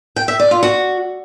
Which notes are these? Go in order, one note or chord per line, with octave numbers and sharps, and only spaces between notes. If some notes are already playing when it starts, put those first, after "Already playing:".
G5
E5
D5
F4
F#4